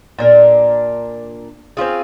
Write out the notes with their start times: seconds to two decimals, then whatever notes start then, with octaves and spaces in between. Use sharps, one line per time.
0.19 A#2 D4 A#4
1.77 C4 C#4 F4 G#4